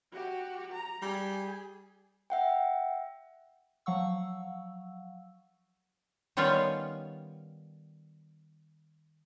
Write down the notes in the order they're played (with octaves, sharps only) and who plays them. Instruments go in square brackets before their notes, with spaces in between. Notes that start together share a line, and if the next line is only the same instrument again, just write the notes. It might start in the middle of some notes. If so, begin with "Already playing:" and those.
[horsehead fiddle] F#4 G4
A#5
[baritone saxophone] G3 [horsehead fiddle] G#4
[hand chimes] E5 F#5 G5
[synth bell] F3 F#3 F5 F#5 C#6 E6
[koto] D#3 G3 B3 C#4 F4 C#5